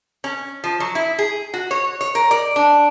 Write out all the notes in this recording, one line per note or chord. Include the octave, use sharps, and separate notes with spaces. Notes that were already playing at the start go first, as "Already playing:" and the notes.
C#4
F3
F#3
E4
G#4
F#4
C#5
C#5
A#4
D5
D4